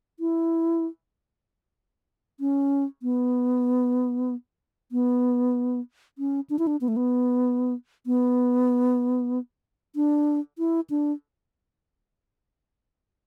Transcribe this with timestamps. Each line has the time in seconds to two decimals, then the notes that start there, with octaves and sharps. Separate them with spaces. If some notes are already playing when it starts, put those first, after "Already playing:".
0.20 E4
2.40 C#4
3.03 B3
4.92 B3
6.18 C#4
6.50 D4
6.59 E4
6.67 D4
6.81 B3
6.88 A3
6.96 B3
8.06 B3
9.96 D4
10.58 E4
10.90 D4